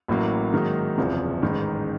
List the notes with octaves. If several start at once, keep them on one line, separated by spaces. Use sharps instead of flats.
A1 A2 F#3 A#3
G#2 D#3 F#3 A#3 D#4
F#1 E2 C3 F3
A1 G#2 D#3